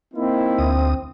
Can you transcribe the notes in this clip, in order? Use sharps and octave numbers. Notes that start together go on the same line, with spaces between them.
A#3 C4 D#4 E4
D2 D#6